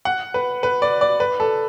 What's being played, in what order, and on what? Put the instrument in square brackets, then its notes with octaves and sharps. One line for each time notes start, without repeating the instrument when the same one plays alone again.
[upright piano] F#5
B4
B4
D5
D5
B4
A4